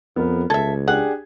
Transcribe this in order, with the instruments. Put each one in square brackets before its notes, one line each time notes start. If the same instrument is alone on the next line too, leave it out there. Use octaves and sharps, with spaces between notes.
[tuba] F2 [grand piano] B3 A#4
[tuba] C#2 [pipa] A4 E5 [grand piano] G#6
[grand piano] D4 G4 G#4 [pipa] F#5